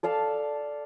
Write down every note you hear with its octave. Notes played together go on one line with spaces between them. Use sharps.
A4 D5 F5 A5